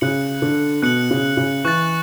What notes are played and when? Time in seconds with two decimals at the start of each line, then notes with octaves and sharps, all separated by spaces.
0.01 C#3 F#6 C#7 F#7
0.42 D3
0.82 B2 F#6 C#7 F#7
1.11 C#3
1.37 C#3
1.64 E3 C#6 F#6 A6